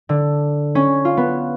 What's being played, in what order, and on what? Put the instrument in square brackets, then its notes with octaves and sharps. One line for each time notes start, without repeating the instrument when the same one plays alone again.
[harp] D3
C#4
F4
B3